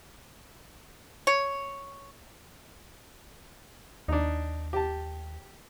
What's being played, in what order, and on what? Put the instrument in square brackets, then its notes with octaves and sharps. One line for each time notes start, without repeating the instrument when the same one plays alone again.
[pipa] C#5
[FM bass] D#2 [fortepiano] D4 D#4
[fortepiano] G4 A5